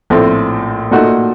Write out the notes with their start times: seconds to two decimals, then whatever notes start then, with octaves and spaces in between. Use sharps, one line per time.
0.10 A#1 A2 A3 C4
0.91 A#2 A3 D#4 F#4